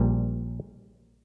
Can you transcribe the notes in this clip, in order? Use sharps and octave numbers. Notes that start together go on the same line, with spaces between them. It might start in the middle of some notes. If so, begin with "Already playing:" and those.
Already playing: A#1 A#2 G3